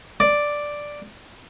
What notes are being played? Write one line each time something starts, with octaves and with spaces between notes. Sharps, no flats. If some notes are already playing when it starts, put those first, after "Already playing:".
D5